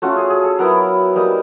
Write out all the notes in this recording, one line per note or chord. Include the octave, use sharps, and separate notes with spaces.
A3 C#4 F4 F#4
G#4
G#4
A4
F#3 B3 E4 A#4
G3 A#3 D#4